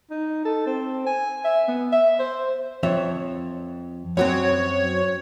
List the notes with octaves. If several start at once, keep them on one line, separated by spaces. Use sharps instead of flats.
D#4
A4
C4
G#5
E5
B3
E5
C5
F2 C#5 E5
F#2 F#3 C4 C#5